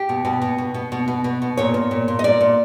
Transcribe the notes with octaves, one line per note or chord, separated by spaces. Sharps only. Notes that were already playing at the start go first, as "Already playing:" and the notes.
Already playing: G4
B2
B2
B2
B2
B2
B2
B2
B2
B2
A#2 C#5
A#2
A#2
A#2
D#5
A#2 D5
A#2